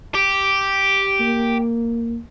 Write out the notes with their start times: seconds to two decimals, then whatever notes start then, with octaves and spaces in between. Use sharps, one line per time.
0.15 G4
1.20 A#3